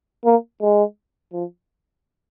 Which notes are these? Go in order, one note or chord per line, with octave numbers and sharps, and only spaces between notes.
A#3
G#3
F3